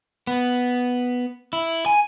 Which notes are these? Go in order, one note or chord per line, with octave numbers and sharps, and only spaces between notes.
B3
E4
G#5